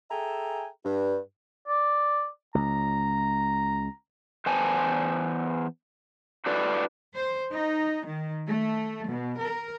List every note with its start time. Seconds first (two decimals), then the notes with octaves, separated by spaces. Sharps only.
0.10 G#4 A4 E5 G5 G#5 A#5
0.85 G2
1.67 D5
2.55 C#2 A#5
4.46 E2 B3 C5 G#5 A5
6.46 D4 E4 F#4 A4 B4 D5
7.15 C5
7.52 D#4
8.05 D#3
8.48 A3
9.09 B2
9.40 A#4